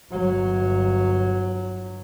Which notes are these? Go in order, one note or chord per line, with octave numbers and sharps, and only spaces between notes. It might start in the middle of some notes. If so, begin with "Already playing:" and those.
G1 F#3